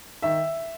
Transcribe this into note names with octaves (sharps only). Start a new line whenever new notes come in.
D#3 E5